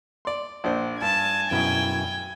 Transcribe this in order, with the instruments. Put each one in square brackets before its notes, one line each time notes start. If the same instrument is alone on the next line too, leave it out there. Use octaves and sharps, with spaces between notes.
[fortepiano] D5 C6
A#1 D4 C5
[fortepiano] G2 [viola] G#5 [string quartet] A5
[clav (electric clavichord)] F#2 B2 E4 [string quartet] G5